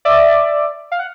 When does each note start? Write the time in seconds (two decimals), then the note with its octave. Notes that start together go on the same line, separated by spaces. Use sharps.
0.05 D5 E5
0.92 F5
0.99 F#5